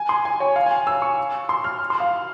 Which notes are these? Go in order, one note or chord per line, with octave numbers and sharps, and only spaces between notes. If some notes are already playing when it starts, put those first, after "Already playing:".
Already playing: G#5
C6
G#5
C#5
F5
G#5
E6
C#6
C6
F6
C6
F5